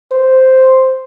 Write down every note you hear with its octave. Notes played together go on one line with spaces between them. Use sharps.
C5